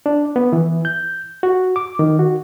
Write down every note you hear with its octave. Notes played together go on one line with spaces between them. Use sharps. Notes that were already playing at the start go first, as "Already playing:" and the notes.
D4
B3
E3
G6
F#4
D6
D#3
F#4